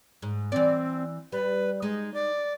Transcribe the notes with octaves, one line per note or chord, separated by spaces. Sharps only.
G#2
E3 C4 D5
G3 B4
G#3 D#4
D5